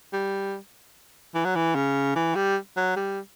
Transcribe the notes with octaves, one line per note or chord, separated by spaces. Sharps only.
G3
E3
F#3
E3
C#3
E3
G3
F#3
G3